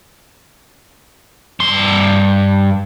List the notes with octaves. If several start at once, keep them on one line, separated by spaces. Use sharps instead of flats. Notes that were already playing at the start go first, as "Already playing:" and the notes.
G2 C6